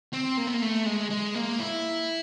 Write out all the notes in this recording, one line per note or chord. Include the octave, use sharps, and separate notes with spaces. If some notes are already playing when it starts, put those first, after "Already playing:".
C4
A#3
B3
A#3
A3
G#3
G#3
A#3
E4